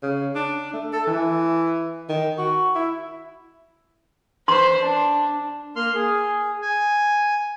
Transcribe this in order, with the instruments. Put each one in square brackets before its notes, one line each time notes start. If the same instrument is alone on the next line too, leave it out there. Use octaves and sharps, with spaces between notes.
[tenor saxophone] C#3
D4
A3
A4
E3
D#3
F#4
E4
[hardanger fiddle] B4 C5 [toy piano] C6
[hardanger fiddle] D4
[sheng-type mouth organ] A#3 C6 F6
G#4
G#5